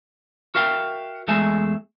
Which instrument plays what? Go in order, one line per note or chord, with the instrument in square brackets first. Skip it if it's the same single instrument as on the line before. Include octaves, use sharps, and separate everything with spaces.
[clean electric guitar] F#4 A#4 E5 F5 G5
E2 G#3 A3 G#4 E5 G#5